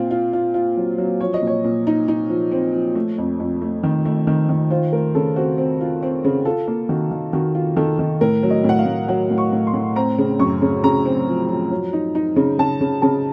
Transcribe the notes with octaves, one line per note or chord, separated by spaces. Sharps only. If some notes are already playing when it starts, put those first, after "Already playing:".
Already playing: A#2 C4 F4
F4
F4
F4
F#3
F#3
F3 C#5
D#5
A#2
C#5
A#2
D#4
D#4
F3
C4
F3
A3
F2
F2
A3
D#3
A3
D#3
D#3
F4 C5
A3 A#4
C#3 A4
C4 F#4
C4
F4
C4
C#3
F4 A4
A#3
D#3 F#4
D#3
D#3 F#4
F4
D#3 A4
D#3
A2 A#4
F#3
D#5
A2
F#5
F5
A2
F#3 F#5
A2
C#6
A2
C6
A2
C4 A#5
C#3
F#2 C#6
C#3
C#3 A#5
C4
F3
F3
F#3
D#4
D#4
C#3
C#3 A5
C#3
C#3 A5